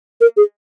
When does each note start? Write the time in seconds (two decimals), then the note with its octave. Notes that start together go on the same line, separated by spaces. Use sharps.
0.21 A#4
0.37 G#4